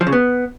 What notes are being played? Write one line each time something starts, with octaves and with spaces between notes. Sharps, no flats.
F3
C#3
B3